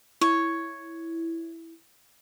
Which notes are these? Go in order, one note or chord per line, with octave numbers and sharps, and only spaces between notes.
E4 C#5